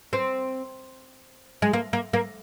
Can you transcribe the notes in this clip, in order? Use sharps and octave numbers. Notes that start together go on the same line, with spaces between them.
C4
G#3
A#3
A#3
A#3